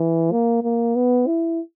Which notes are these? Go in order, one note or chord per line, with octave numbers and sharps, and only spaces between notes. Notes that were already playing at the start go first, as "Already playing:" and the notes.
Already playing: E3
A#3
A#3
B3
E4